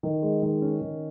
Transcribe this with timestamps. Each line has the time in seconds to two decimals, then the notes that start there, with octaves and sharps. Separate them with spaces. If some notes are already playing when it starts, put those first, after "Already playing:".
0.03 D#3
0.22 G#3
0.42 D#3
0.62 C#4
0.81 D#3